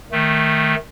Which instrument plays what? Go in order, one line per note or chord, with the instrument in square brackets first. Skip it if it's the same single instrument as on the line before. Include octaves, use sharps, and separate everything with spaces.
[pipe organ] D#3 A3